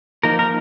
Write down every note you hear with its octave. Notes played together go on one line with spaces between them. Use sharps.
F3 A#3 D#4 A#4
A#4